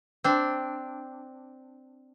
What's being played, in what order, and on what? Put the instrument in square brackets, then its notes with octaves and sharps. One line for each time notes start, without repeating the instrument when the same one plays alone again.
[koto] C4 D4